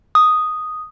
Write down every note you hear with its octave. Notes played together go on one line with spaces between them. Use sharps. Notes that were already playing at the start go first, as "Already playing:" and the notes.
D#6